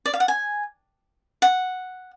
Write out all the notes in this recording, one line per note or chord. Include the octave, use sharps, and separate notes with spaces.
D5
F5
F#5
G#5
F#5